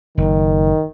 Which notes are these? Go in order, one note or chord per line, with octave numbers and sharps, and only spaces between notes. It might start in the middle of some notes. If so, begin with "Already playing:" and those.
F#1 D#3